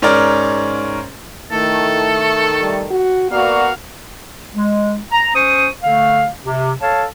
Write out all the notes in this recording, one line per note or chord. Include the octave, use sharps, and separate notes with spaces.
G#2 C#4 A#4 D5 F6
D#3 A3 E4 A4
G3
F#4
A#3 B3 F#4 D5 F5
G#3
A#5
C#4 C5 C#6 D#6
D3 A3 F5
C3
A4 C#5 F5 A5